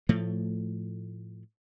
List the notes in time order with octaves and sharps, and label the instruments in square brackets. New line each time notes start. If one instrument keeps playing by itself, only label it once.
[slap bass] A2 F3 A3